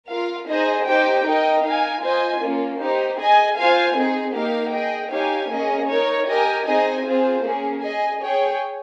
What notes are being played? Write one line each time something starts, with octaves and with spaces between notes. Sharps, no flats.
F4 A#4 F5
D#4 G#4 C5 D#5
D#4 G4 C5 G5
D#4 A#4 D#5 G5
D#4 A#4 F5 G#5
F4 C5 D#5 G#5
A#3 C#4 F4
D#4 G4 C5
G#4 D#5 G#5
F4 C5 F5 G#5
C4 D#4 G#4
A#3 D#4 G4 A#4 F5
G#4 D#5 G5
D#4 G4 C#5 F5 G#5
A#3 C#4 G#4 D#5
D#4 A#4 C#5
G4 A#4 D#5 G#5
C4 D#4 G#4 D#5 G#5
C4 F4 G#4 C5
A#3 C#4 G#4
G#4 D#5 G#5
G#4 C#5 G5